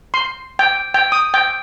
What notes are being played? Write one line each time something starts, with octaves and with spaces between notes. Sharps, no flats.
C6
G5
G5
D#6
G5